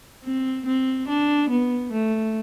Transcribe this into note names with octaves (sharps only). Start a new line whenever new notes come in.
C4
C4
D4
B3
A3